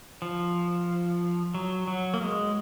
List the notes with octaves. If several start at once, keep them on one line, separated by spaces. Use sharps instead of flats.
F3
F#3
F#3
A#3
G#3